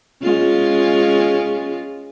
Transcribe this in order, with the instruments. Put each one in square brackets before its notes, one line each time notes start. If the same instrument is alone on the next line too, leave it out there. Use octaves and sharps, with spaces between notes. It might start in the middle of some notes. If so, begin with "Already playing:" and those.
[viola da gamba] G#3 C#4 F4